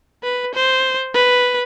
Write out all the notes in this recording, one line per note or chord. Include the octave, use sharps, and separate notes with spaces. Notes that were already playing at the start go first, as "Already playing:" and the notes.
B4
C5
B4